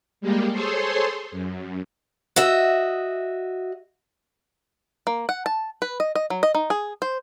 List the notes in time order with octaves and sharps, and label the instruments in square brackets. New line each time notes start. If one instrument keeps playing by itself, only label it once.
[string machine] G3 G#3 A#3 G4
G#4 A4 C5 C#5 C6
F#2
[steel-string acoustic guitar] F#4 D#5 E5
[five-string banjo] A#3
F#5
A5
B4
D#5
D#5
F#3
D#5
D#4
G#4
C5